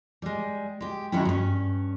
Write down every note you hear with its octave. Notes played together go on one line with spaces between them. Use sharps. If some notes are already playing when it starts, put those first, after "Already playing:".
G3 G#3
G#3 G4
D#3 F#3 G#3 C#4 E4
G2 C#4